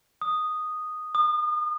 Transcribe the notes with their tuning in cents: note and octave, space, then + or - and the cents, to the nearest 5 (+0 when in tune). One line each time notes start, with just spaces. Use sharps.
D#6 -5
D#6 -35